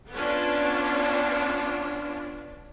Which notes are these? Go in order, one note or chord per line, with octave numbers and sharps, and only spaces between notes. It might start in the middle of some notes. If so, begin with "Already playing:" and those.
B3 C#4 D4 F4